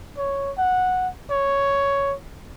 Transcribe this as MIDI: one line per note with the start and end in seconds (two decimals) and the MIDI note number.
0.18 0.51 73
0.57 1.08 78
1.30 2.15 73